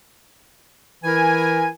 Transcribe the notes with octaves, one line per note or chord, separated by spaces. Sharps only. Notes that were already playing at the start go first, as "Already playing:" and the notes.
E3 E4 A#4 G#5